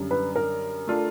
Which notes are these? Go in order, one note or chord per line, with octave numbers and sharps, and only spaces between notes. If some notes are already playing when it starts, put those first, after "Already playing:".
Already playing: F#2 D3 G3
B4
A#4
A3 D4 F4 A4